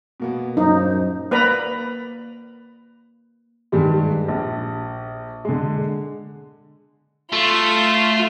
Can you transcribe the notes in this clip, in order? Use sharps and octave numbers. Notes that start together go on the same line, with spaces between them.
B2 A#3 B3
D#1 F#2 D#4 C5
A#3 B4 D5 A#5 B5
G2 D#3 G3 G#3
A#1
D3 G#3
A3 F4